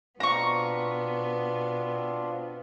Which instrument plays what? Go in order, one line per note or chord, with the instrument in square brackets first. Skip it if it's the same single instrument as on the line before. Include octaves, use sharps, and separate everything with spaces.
[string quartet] B2 B3 [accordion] C4 D4 F4 [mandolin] A#5 C#6